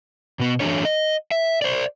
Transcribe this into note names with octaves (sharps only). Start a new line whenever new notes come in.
B2 B3
E3 F#3 A3 D4 C#5
D#5
E5
C5 D5